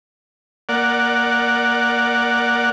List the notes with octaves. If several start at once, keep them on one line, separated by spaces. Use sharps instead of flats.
A#3 D5 F#5